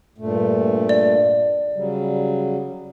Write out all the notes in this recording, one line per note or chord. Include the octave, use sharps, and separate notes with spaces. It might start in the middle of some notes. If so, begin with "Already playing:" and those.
G2 A#2 A3
D5
C#3 F#3 G3